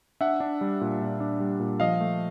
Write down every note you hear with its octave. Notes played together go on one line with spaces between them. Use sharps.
D4 E5 F#5
D4
G3
A#2
A#2
D4
G3
A#2
F3 D#5 F5
A3